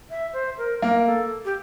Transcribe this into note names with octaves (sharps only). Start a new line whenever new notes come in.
E5
C5
A#4
A#3 A#4
A4
G4